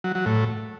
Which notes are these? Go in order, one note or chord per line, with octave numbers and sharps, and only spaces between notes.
F#3
F#3
A2